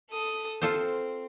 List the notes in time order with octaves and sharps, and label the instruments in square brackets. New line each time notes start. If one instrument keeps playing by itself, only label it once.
[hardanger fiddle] A4 D#6
[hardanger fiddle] C4 [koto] F4 A4 C5